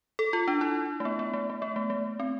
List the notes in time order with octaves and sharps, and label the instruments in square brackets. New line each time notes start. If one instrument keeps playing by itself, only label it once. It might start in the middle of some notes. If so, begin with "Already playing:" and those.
[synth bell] A4
F4
D4
E4
A3
B3
B3
A3
A3
B3
A3
A3
C4